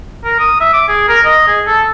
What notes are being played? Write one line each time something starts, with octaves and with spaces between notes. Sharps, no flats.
A#4
D#6
E5
D6
G#4
A#4
D#5
G#4
A4